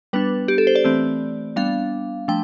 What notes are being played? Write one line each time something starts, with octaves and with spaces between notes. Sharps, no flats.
G3 B3 D4 B4
G4
A4
C5
D5
E3 A3 C4
G3 B3 D4 F5
F3 A3 D4 G5